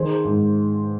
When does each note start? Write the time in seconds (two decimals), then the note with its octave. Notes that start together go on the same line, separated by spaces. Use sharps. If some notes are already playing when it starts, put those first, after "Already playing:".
Already playing: D#3 G#4 C5
0.25 G#2